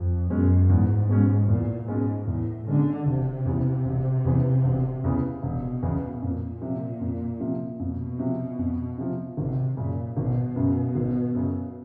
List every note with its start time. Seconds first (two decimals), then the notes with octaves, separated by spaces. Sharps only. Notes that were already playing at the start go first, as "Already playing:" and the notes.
Already playing: F2
0.30 F#2 B2 G#3 C#4
0.69 E2 G#2
1.09 B2 G#3 C#4
1.48 E2 A#2
1.88 G#2 B2 G#3 C#4
2.27 E2 A2
2.67 B2 D3 G#3 C#4
3.07 E1 C3
3.46 E2 C#3 E3
3.85 E1
4.25 E2 C#3 E3
4.64 E1
5.04 E2 C#3 E3
5.43 E1 B2
5.83 E2 C#3 E3
6.22 F2 A#2
6.61 C3 F3
7.01 F2
7.40 C3 F3
7.79 F2 B2
8.19 C3 F3
8.59 F2
8.98 C3 F3
9.37 G#1 C3
9.76 F#2 A#2 C#3
10.17 G#1 B2
10.56 F#2 C#3
10.95 G#1
11.35 F#2 C#3